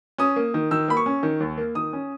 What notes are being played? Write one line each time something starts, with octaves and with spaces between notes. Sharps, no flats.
C#4 D#6
A#3
D#3
D#3 E6
A#3 B5
C#6
C#4
D#3
D#2
A#3
D#3 D#6
C#4